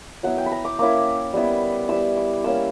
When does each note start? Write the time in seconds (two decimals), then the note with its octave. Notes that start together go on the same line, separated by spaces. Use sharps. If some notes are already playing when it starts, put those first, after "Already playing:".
0.23 F#3 B3 E4 F#5
0.38 G5
0.46 B5
0.52 A#5
0.65 D6
0.79 A#3 C#4 E4 D6
1.33 G3 B3 E4
1.89 G3 B3 E4 E6
2.17 D6
2.44 G3 A#3 C#4 E4 E6